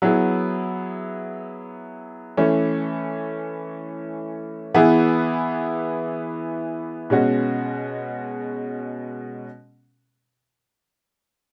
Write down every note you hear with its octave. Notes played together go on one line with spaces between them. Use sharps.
F#3 B3 E4 G#4
E3 A3 C#4
E3 B3 E4 G#4
B2 G#3 C#4 F#4